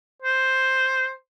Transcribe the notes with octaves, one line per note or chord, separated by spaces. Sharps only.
C5